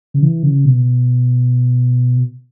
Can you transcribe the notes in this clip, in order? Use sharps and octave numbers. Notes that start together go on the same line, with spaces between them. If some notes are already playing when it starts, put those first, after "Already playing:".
C#3
E3
C#3
B2